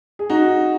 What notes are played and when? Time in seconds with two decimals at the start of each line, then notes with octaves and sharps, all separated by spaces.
0.19 G#4
0.30 D#4 F#4